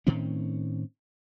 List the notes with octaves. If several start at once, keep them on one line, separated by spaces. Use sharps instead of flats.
A2 D#3 C4 C#4